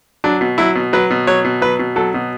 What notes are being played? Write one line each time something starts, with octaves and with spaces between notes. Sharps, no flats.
F#3 D4
B2
F#3 E4
B2
F#3 B4
B2
F#3 C#5
B2
F#3 B4
B2
F#3 A4
B2